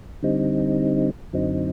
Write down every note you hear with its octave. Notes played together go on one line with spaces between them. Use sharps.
D3 G3 C4 D#4
F#2 D3 F#3 C4 D#4